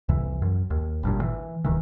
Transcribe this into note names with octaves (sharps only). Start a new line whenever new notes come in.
C2 F2 E3
F#2
D#2
G#1 G2 A#2
E3
D#1 D#3 E3